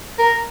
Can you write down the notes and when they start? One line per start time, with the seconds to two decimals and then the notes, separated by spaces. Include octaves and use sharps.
0.19 A#4